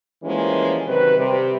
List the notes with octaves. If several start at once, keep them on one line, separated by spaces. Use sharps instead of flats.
E3 F3 G3 G#3 A#3 C#4
C3 D#3 F#3 B4
C3 G3 G4